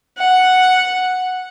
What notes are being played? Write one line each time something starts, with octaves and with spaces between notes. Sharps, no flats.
F#5